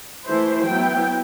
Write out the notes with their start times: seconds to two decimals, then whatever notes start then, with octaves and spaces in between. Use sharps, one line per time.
0.26 E3 A3 E4 C5
0.67 F#3 B3 E4 G5